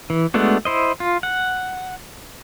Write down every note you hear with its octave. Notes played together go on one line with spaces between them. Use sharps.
E3
G#3 A3 B3 D4 F#4
E4 C5 D#5
F4
F#5